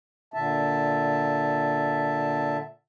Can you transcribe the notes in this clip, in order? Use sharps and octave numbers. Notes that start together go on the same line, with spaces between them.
A#2 D3 E5 A5